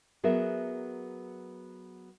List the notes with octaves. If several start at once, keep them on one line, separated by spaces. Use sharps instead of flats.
F#3 B3 G#4 A#4 E5